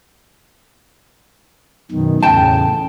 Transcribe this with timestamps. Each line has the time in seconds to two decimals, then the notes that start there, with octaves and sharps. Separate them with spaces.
1.91 F#2 B2 D#3
2.23 E2 A2 C#3 G5 A5